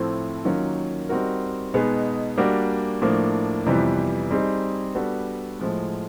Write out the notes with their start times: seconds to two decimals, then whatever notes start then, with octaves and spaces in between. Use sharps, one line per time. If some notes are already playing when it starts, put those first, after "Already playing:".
Already playing: A2 F3 A3 C4 E4
0.45 D#3 F#3 A#3 C#4 F4
1.09 G3 C4 D#4 F#4 A#4
1.74 B2 G#3 B3 D#4 G#4
2.37 G3 A#3 D4 F#4
3.02 A2 F3 A#3 D4
3.66 F2 C3 E3 G3 B3
4.31 G3 C4 D#4 G#4
4.94 G3 B3 D4 F#4 A4
5.59 A2 F3 G#3